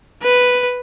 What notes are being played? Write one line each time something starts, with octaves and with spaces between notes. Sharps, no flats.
B4